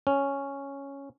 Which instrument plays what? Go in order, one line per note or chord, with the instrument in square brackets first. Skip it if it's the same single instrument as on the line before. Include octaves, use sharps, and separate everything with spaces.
[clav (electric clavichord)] C#4